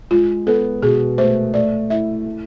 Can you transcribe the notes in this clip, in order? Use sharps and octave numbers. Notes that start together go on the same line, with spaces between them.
G#3 F4
B3 A4
B2 G#4
A3 C5
A3 D5
E4 E5
A3